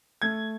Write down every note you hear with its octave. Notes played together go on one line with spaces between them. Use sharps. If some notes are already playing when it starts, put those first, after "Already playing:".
A3 G#6